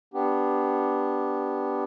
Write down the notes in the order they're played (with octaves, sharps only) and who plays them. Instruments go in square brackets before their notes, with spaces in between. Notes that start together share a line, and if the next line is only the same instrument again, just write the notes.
[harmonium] B3 D4 G4